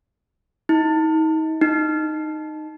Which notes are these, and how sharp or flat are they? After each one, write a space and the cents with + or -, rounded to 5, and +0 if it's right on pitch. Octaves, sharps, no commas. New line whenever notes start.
D#4 +35
D#4 -10